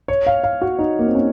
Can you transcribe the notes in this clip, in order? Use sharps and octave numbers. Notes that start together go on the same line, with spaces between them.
C#5
F5
F5
F#4
D#4
A#3
C4
C#4